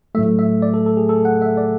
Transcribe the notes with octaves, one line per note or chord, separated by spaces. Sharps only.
A2 F#3 A3 E5
E5
D5
A4
A4
G#4
A4
F#5
E5
D5